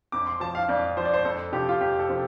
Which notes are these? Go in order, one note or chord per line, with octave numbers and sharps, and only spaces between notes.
F2 D6
C6
F3 A5
F5
F2 D5
F3 C5
D5
C5
F2 A4
C3 F3 G4
F4
F2 G4
A4
C3 F3